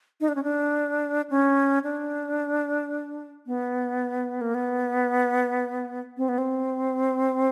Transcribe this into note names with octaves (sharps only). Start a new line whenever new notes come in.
D#4
D4
C#4
D4
C#4
D4
B3
A#3
B3
C4
B3
C4